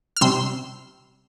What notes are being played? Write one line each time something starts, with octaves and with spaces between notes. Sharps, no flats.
F6
C3 G3 C6 E6